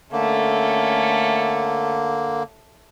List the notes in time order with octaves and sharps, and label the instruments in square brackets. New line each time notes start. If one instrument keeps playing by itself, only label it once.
[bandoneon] D3 A#3 [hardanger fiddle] A3 C#4